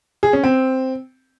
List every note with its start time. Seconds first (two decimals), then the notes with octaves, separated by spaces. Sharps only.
0.23 G#4
0.33 C#4
0.44 C4